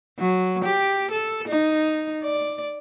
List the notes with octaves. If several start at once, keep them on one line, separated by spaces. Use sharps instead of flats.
F#3
G4
A4
D#4
D5